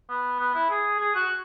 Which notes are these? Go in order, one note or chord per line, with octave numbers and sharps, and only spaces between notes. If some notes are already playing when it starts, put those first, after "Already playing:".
B3
B3
E4
G#4
G#4
F#4